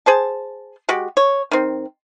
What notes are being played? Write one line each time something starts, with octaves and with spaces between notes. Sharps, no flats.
G#4 C5 A5
G#3 F#4 G4
C#5
D#3 C4